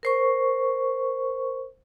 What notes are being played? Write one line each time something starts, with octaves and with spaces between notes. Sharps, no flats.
A#4 C5 C#6